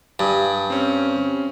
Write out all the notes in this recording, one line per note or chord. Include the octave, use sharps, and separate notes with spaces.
G2 D5 G#5 D#6
C4 C#4